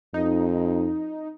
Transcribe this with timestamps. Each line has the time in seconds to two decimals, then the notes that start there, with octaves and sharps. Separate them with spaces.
0.14 F2 D#4